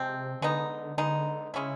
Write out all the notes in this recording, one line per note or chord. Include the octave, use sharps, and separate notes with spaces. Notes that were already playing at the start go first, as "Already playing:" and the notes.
Already playing: C3 F3 G#3 C4
D3 G#3 B3 D#4
D3 G#3 B3 D#4
C#3 G#3 C#4 E4